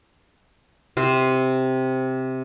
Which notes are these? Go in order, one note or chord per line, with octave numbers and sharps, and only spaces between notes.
C3 C4 C5